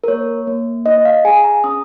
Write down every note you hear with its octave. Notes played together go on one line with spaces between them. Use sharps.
A#4
A#3 C#5
A#3
D#4 D#5
F5
G#4 G#5
A#5
C#4 D#6